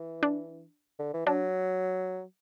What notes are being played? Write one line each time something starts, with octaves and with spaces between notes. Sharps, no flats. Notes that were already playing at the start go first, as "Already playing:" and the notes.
Already playing: E3
D4
D3
E3
F#3 D4